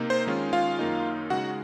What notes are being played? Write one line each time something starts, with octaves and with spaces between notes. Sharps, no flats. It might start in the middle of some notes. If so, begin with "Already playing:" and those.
Already playing: C3 A#3 D#4
C5
D#3 G#3 C#4 F4
F4 F5
F#2 D#3 A#3 D#4
C#3 G#3 D#4 F#4 F#5